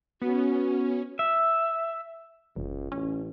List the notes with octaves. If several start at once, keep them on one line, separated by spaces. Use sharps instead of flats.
B3 C#4 F#4
E5
F1 C#2
A1 C#4